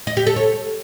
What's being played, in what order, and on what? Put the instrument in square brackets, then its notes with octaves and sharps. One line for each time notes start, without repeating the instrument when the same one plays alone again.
[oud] D#5
G4
A4
C#5